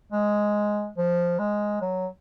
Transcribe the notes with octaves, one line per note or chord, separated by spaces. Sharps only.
G#3
F3
G#3
F#3